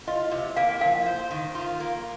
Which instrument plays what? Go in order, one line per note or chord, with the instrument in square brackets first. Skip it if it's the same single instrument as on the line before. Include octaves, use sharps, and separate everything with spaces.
[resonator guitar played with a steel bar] F4 [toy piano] D#5
[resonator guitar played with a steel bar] C3
[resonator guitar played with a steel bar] A#3 [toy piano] F5
[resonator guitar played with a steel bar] F3 [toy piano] F5
[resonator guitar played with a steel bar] C5
D#3
F4
A#3